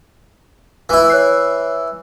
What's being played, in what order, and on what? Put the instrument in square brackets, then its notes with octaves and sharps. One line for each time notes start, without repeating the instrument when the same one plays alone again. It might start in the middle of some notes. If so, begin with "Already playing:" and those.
[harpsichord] E3 E4
[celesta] C#5 F#6 C7